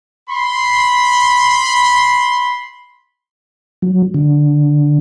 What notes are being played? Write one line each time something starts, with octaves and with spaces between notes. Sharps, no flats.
B5 C6
F#3
D3